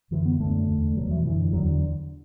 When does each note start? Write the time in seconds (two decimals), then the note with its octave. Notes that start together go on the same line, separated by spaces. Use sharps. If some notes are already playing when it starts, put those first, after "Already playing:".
0.11 F#2 D3 E3
0.25 B3
0.40 F#2 D3 A3
0.68 E2 D3
0.96 E2 B2 F#3
1.11 E3
1.25 F#2 D3 E3
1.53 E2 D3 F#3